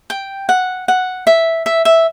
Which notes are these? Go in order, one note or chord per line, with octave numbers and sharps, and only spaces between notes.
G5
F#5
F#5
E5
E5
E5